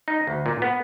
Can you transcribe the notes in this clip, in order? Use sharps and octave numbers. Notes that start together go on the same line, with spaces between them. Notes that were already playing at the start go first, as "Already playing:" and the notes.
D#4
D2
A#2
B3